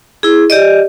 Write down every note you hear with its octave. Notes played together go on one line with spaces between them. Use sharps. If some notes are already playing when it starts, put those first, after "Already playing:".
E4 G#4
G4 D5 D#5